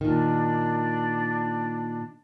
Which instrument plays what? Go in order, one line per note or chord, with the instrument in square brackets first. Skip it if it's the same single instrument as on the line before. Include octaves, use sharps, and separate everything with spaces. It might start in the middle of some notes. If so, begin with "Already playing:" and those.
[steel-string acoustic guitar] A#2 D#3 [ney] D4